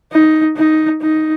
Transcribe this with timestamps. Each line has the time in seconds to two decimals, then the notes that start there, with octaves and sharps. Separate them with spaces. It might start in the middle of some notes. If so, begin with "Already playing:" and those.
0.12 D#4
0.57 D#4
1.01 D#4